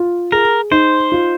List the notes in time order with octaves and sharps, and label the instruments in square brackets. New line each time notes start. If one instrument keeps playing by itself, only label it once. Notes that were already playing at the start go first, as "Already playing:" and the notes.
Already playing: [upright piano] F4
[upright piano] G#4 [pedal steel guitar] A#4
[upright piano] D#4 [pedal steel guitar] C5
[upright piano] F4